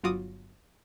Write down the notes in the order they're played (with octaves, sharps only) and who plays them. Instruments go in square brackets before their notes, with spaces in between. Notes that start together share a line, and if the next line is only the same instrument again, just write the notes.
[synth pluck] G1 F#3 F4 F#4 D6 D#6